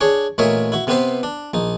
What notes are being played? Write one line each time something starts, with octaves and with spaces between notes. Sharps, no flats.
D4 G#4 C#5
A1 A#2 A#4 C#5 D#5 E5
E4 F#4
C3 B3 C4 G4 B4 C5
D4
A#1 D#4